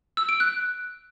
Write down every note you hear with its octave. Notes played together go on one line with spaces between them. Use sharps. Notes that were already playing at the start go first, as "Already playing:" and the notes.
E6
D7
F#6